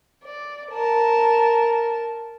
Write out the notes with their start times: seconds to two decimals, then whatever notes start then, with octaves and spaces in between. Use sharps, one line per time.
0.25 D5
0.71 A#4 A5